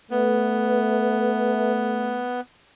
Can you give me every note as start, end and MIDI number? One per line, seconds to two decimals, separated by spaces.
0.11 2.27 57
0.11 2.41 59
0.11 1.73 71